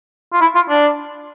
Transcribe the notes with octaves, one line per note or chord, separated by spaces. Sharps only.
F4
E4
F4
D4